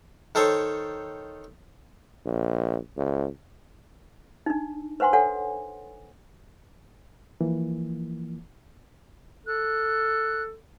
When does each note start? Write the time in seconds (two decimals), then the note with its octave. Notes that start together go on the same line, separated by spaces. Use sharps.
0.35 D#3 A4 C5 C#5
2.26 A#1
2.97 C#2
4.46 D4 D#4
5.00 B4 C5 F#5 G#5 C6
5.13 A4 C#5 F#5 G#5
7.41 E3 F3 A#3
9.46 A4 F#6